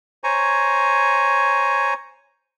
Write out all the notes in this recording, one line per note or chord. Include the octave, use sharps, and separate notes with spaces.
C5 C#5 G#5 A#5 C#6